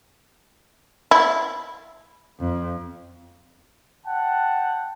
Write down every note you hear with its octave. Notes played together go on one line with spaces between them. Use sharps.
E4
F2
F#5 G5 A5